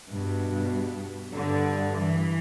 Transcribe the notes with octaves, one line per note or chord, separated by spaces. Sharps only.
G2 B2
G2 D3
E3